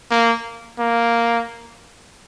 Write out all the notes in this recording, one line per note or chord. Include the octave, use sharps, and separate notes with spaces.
A#3
A#3